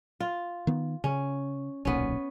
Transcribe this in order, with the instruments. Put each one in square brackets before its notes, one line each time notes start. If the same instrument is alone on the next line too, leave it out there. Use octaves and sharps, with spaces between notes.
[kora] F4
[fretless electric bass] D#3 B3
[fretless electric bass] C#3 [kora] C#4
[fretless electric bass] D1 B1 A#2 [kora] B3 C#4